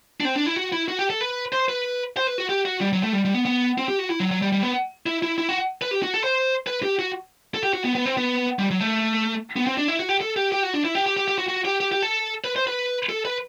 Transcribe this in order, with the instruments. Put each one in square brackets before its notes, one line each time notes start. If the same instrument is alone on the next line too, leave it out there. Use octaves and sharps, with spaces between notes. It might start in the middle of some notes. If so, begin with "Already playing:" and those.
[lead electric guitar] D4
C4
D4
E4
F#4
E4
F#4
G4
A4
B4
C5
B4
C5
B4
F#4
G4
F#4
G3
F#3
A3
G3
G3
B3
B3
C4
G4
F#4
E4
F#3
F#3
G3
G3
B3
E4
E4
E4
F#4
B4
G4
F#4
A4
C5
B4
G4
F#4
A4
G4
F#4
B3
B3
C4
B3
G3
F#3
A3
B3
C4
D4
E4
F#4
G4
A4
G4
G4
F#4
D4
E4
G4
G4
G4
G4
F#4
F#4
G4
G4
G4
A4
B4
C5
B4
A4
B4